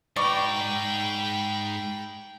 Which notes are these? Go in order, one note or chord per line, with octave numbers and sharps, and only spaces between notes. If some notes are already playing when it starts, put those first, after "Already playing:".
G#2 B2 D5 G5 A#5 B5 C#6